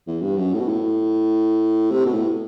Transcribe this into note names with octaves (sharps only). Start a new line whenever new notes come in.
E2
G2
F#2
A2
B2
A2
C3
B2
A2